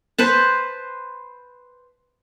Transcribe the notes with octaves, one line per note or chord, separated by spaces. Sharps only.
B4 C5 A5